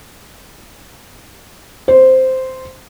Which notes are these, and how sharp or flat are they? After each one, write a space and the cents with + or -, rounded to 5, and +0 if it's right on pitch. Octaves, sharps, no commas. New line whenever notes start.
C5 -5